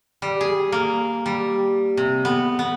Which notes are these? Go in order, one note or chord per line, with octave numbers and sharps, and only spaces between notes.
G3
G#4
A#3
G3
C3
B3
B3